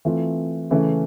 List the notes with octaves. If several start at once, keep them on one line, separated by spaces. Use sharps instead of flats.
E3 A3 C4 F4
C#3 E3 A3 C#4